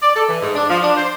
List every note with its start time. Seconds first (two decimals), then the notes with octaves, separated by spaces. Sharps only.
0.02 D5
0.15 A4
0.29 E3
0.41 G#2
0.55 D4
0.70 F3
0.82 D4
0.97 C5